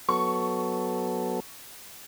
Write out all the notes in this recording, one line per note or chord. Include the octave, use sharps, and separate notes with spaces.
F#3 B3 A4 C#6